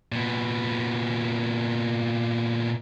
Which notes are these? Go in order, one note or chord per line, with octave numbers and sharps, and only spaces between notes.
A#2 B3